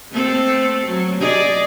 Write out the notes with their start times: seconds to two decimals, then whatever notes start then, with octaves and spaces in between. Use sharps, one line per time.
0.11 A3 C4 A4
0.86 F#3
1.20 G#4 D5 D#5